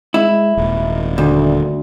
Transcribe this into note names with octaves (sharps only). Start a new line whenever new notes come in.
G#3 E4
D#1 G#1
D2 D3